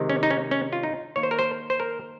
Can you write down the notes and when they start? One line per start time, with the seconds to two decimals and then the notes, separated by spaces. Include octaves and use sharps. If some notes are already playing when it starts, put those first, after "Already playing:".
Already playing: C3 D#3 G#3
0.09 C#4
0.23 D#4
0.30 C#4
0.51 C#4
0.73 F4
0.83 D#4
1.16 D#3 A#3 C#5
1.23 C5
1.31 A#4
1.39 C5
1.70 C5
1.80 A#4